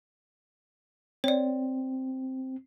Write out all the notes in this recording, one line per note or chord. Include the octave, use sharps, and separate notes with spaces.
C4 C#5 D5